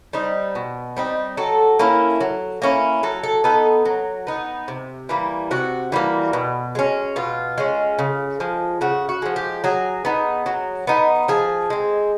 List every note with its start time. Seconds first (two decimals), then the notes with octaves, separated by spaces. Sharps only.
0.13 G3 C4 D#4
0.55 B2
0.97 G3 C4 D#4
1.37 F#3 A4
1.79 A#3 C#4 E4
2.21 F#3
2.62 A#3 C#4 E4
3.03 F#3 A4
3.23 A4
3.44 B3 D#4 A4
3.85 F#3
4.27 B3 D#4
4.68 C3
5.09 E3 G3 A#3
5.51 C3 F#4
5.92 E3 G3 A#3
6.33 B2
6.75 G#3 C#4
7.16 B2 F4
7.58 G#3 C#4
7.99 C#3
8.40 F3 G#3
8.81 C#3 F#4
9.09 F#4
9.22 F3 G#3
9.36 G4
9.64 F#3 G#4
10.05 B3 D#4
10.46 F#3
10.87 B3 D#4
11.28 F3 G#4
11.70 G#3 C4